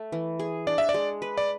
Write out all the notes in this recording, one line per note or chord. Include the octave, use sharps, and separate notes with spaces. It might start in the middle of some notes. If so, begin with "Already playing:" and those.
Already playing: A3
E3
G#4
D4 D5
E5
D5
G#3
B4
D5